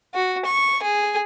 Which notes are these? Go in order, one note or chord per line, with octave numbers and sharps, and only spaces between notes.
F#4
C#6
G#4